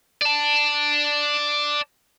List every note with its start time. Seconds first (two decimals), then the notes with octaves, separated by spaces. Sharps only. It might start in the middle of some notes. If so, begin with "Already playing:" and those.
0.22 D5 A5